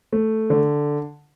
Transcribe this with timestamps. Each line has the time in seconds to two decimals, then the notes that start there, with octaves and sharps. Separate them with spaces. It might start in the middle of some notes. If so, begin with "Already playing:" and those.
0.13 A3
0.50 D3